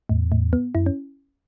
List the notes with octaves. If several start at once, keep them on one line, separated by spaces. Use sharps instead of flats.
E2 A2
A2
B3
F#2 E4
C#4